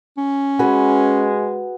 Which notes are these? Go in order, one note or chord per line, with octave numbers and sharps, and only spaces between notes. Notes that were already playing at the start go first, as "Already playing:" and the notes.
C#4
G#3 F#4 G#4 B4